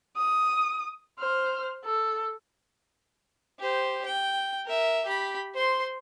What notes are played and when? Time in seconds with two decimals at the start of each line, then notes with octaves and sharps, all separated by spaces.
0.17 D#6
1.19 C5 F6
1.85 A4
3.60 G4 C5
4.06 G5
4.65 A#4 E5
5.05 G4 B5
5.55 C5 C6